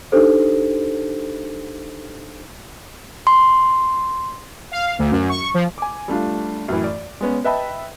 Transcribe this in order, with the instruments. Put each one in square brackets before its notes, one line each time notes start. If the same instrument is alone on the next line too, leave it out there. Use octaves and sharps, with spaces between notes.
[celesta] D4 D#4 G4 A4 C5
[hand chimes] C6
[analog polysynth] F5
D2
F#2
C#6
F3
[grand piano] G#5 D6
G3 A3 D4 F4
F#2 A2 E3
D5
G#3 B3 C#4
B4 D#5 E5 G5 A5 B5